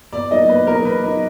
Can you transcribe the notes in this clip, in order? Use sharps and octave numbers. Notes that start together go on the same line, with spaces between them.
B2 D5
F#3 A#3 D#4 D#5
B2 B4
F#3 A#3 D#4 A#4
B2 B4
F#3 A#3 D#4